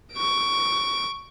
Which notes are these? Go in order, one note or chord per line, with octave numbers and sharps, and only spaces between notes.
C#6 D7